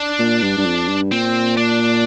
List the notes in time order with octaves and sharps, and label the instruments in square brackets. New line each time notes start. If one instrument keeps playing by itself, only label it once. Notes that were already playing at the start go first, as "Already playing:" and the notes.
Already playing: [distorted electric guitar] D4
[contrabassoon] A#2
G2
G2
F2
G2
[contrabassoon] A#2 [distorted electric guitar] C4
[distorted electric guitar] D4